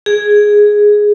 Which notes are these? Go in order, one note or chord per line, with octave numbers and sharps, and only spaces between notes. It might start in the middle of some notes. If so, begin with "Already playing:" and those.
G#4